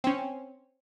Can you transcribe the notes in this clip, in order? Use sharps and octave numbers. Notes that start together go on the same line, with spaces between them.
C4 C#4